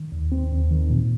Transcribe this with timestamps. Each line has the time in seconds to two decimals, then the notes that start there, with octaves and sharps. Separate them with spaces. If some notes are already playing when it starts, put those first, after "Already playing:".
Already playing: D#3
0.12 D#2
0.32 C4
0.51 D#2
0.71 D#3
0.90 A#2